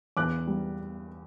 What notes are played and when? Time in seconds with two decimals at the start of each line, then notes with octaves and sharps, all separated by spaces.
0.17 E2 D6 F#6
0.47 G3